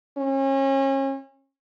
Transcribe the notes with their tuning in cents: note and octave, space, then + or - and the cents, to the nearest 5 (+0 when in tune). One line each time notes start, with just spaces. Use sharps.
C#4 -35